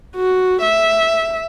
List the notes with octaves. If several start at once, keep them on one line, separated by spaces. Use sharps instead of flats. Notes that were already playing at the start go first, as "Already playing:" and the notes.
F#4
E5